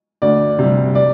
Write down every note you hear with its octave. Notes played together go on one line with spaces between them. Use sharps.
D2 D5
C3
G3
D5